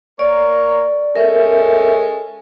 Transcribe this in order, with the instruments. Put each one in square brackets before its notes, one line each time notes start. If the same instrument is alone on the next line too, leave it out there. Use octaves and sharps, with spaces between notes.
[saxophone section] A#3 A#4 C#5 [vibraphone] D5
[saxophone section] G#3 C#4 A4 [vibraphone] A#4 E5